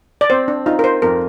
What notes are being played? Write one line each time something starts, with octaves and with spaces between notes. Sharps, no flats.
D5
C4 C5
D4
D#4 F4
A#4
C5
F2 A#4